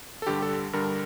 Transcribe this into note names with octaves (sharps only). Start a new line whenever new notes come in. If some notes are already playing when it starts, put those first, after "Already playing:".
A4
G2 D3 G3 G4
A4
G2 D3 G3 A#4